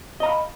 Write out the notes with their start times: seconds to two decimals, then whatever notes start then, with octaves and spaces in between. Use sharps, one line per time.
0.20 D#5
0.23 A#5
0.26 F5
0.29 B5